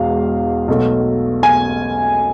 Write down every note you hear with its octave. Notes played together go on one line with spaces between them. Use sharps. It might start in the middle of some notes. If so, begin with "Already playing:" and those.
Already playing: E1 E2 G#3 F5
B1 B2 A3
G#5